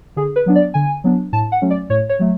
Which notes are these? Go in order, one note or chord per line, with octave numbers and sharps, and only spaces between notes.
D3 G#4
B4
F#3 B3 D4
D5
D3 G#5
F#3 B3 D4
A2 A5
F#5
F#3 A3 C#4
D5
A2 C#5
C#5
F#3 A3